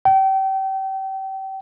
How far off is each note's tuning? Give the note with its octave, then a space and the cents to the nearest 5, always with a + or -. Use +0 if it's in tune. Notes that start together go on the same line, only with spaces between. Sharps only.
G5 -30